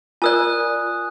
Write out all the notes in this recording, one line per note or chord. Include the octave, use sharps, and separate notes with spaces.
F4 A#4 D5 G#5 D#6 F#6